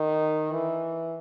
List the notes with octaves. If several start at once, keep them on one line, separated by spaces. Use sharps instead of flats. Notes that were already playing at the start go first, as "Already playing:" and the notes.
Already playing: D#3
E3